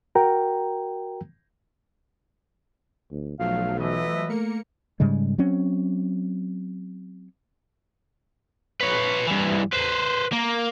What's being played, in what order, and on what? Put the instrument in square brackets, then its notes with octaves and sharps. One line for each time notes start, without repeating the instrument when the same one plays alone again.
[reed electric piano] F#4 A#4 G5 A#5
[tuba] D2
[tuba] B1 [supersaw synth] F3 F#3 A3 [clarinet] F5
[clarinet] E3 [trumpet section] B4 D#5 E5
[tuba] A3 [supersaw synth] A#3 A#4 C#7
[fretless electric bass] G#2 C#3 G3 G#3
F#3 C4 C#4
[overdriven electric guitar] B4 C#5
G2 E3
B4 C5
A#3